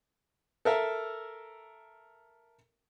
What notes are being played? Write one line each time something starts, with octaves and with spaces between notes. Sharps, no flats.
A4 A#4 E5